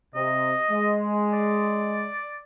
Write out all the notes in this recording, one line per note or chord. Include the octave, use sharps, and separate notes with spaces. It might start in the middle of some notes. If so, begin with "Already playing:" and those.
C3 D#5
G#3
D5